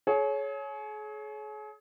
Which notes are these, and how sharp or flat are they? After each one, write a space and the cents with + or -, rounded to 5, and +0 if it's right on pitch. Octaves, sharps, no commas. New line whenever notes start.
G#4 +40 C#5 +0